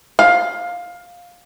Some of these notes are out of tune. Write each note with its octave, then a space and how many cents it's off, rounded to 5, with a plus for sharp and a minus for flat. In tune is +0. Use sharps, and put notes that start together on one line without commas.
F5 +15